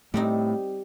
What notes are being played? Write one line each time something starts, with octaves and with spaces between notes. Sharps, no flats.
A2 G3 A3 C4 D#4